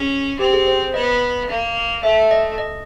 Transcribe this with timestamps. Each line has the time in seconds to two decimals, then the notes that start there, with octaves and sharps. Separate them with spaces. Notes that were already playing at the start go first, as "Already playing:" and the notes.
Already playing: C#4 G#4
0.39 C4 G4
0.53 G#4
0.67 C5
0.94 B3 D#5
1.49 A#3
2.03 A3 E5
2.31 D#5
2.58 D#5